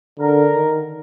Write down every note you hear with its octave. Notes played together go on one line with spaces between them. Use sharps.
D3 A#4
D#3